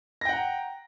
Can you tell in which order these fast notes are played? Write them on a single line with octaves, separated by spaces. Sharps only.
A#6 G5 F#5 A#5